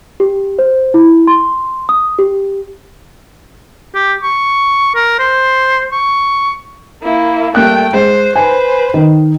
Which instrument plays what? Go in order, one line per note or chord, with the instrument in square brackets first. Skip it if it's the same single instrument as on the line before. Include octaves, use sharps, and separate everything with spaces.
[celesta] G4
C5
E4
C6
D#6
G4
[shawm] G4
C#6
A#4
C5
C#6
[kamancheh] A#3 E4
[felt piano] G3 A#3 F#6 [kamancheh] A3 G5
[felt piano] G#3 [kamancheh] C5
[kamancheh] B4 C5 [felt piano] G#5
[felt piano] D#3